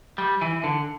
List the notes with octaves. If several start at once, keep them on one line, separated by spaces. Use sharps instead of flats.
G3
E3
D3